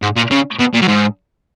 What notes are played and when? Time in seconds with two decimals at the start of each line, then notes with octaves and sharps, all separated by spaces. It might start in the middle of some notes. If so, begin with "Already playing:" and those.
0.02 G#2
0.17 A#2
0.31 C#3
0.60 B2
0.74 A#2
0.82 F#2
0.88 G#2